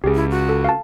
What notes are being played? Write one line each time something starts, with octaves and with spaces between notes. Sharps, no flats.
C#2 G4 G#4
E4
F#4
A4
F5 A5